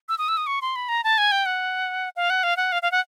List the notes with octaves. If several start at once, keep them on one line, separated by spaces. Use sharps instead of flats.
E6
D#6
E6
D#6
C#6
C6
B5
A#5
A5
G#5
G5
F#5
F5
F#5
F5
F#5
F5
F5
F#5